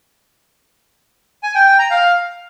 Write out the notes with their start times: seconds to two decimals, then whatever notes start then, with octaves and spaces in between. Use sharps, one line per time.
1.43 G#5
1.55 G5
1.67 G5
1.79 A#5
1.91 F5